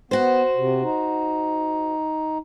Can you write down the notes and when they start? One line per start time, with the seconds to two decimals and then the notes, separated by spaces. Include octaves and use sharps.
0.11 B3 F#4 C5
0.56 C3
0.83 D#4